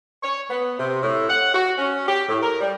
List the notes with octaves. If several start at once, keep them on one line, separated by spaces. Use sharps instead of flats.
C#5
B3
C3
A2
F#5
F#4
C#4
G4
A2
A#4
G3